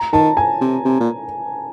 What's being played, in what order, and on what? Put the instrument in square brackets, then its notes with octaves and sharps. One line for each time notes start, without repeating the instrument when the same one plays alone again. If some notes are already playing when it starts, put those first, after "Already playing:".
Already playing: [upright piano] A#5
[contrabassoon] D#3 [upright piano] A5
[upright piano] G#5
[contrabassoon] C3
C3
A#2